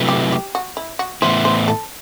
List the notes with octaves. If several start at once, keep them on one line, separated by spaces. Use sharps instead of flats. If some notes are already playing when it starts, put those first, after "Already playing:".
Already playing: C3 F#3 A3 E4 B4
G4
G4
F#4
E4
F#4
A2 E3 B3 E4 C5
C5
A4